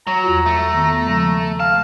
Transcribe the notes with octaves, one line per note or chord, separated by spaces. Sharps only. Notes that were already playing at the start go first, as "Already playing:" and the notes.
F#3 A#5
E2 F4 F#4
A3
D#3 B3
C#3 F3 G#3
F5 A5